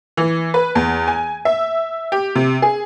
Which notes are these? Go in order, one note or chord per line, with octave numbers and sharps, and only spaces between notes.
E3
B4
E2
G#5
E5
G4
C3
G#4